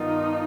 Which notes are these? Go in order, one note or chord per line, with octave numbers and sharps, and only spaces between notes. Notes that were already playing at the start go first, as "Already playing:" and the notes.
Already playing: G2 D#3 B3 D#4 F4